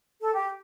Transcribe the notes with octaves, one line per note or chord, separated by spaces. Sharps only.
A4
G4